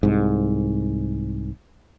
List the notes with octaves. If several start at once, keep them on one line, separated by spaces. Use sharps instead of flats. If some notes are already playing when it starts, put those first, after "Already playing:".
C2 G#2